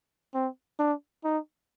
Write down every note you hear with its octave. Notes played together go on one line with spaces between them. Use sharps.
C4
D4
D#4